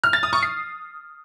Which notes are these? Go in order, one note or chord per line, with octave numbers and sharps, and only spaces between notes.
F6
A6
D#6
C#6
C7